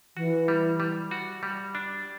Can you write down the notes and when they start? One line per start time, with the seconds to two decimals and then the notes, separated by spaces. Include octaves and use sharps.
0.17 E3 F#4
0.48 G3
0.80 G3
1.11 F#4
1.43 G3
1.75 D4